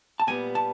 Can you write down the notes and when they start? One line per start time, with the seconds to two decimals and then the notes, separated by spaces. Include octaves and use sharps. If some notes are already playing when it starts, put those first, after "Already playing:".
0.20 A5
0.27 A#2 G3 B3 G#5
0.55 A5